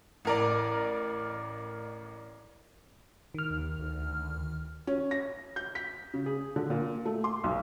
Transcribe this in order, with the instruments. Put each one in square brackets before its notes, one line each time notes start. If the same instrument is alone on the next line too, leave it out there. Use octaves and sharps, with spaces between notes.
[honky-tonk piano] A1 A#4 D5
[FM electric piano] D#3 F6
[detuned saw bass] D#2
D2
[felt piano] C#4
A#6
G6
B6
C#3
G#4
D3
A#2
A3
C6
B1